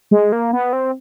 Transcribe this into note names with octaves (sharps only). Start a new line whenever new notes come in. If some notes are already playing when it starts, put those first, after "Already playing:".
G#3
A#3
B3
C4